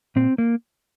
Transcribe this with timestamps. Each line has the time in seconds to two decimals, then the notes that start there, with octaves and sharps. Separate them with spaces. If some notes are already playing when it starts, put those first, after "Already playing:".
0.16 A#2 C4
0.38 A#3